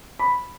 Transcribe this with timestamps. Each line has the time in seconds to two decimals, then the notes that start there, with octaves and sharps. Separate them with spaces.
0.19 B5